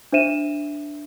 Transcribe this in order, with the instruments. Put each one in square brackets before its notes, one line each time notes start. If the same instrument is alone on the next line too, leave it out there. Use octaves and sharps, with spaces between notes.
[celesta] D4 C5 E5 D#7 E7